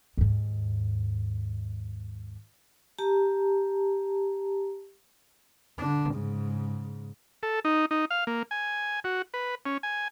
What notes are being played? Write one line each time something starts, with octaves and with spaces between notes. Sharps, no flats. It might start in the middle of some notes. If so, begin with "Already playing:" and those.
D#2 G#2
G4 A5 A#5
D3 D4
G#2 C#3
A4
D#4
D#4
F5
A#3
G#5
F#4
B4
C#4
G#5